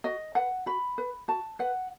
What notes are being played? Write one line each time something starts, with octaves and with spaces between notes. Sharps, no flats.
F#4 D#5
B4 F#5
F#4 B5
B4
F#4 A5
B4 F#5